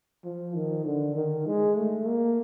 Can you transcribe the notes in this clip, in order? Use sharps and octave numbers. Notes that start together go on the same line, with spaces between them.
F3
D#3
D3
D#3
G#3
A3
A#3